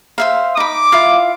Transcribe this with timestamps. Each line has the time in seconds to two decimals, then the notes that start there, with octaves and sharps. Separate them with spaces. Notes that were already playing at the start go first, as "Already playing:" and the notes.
0.18 C5 E5 F5
0.57 D#4 B5 D6
0.92 E4 F4 F5